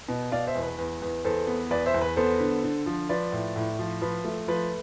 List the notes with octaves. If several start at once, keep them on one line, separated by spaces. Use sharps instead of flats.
B2
B2 D5 F5
C5 E5
E2
B4
E2
E2
E2 A4 C5
B3
E2 B4 D5
C5 E5
E2
B4
B3 A4 C5
D3
D3
F3
F3 B4 D5
A2
A2
F3
F3 B4
A3
F3 B4